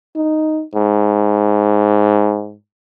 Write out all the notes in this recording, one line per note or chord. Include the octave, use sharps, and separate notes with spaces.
D#4
G#2